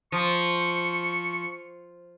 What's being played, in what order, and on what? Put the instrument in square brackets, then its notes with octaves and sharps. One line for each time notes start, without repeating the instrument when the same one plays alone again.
[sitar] F3 [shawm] C#6